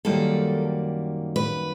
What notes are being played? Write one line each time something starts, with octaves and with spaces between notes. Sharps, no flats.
F#2 D#3 G3 A#3 A4
B4